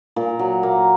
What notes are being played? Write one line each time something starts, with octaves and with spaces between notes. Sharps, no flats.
A#2
F#3
A#3